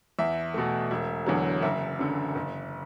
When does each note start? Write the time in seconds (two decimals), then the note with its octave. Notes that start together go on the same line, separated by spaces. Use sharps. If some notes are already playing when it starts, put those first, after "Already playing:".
0.19 E2 E5
0.54 B2 A3
0.91 E1
1.26 E2 D3 F#3
1.62 F#1 E5
1.99 F#2 D3
2.35 F#1